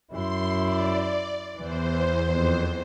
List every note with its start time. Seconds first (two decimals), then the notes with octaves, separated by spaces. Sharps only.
0.12 F#2 E4 C6
0.63 D5
1.57 E2 E3 C5
2.31 F2